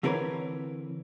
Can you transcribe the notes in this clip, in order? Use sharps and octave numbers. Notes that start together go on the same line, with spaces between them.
D3 E3 C4 A#4 B4 C#5